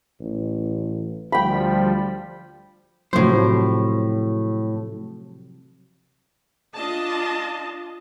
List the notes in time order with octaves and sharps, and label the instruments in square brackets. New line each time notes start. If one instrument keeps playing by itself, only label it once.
[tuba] A1
[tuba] D2 [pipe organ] F3 G3 [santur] G5 B5
[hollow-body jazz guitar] A2 C5 [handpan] C3 F3 F#3
[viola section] D4 F4 D#5 A5